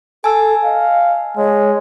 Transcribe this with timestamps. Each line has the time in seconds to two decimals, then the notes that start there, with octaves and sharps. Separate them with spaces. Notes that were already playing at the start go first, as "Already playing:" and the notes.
0.24 A4 G#5 A5 E6
0.64 D#5 F5
1.37 G#3 C#5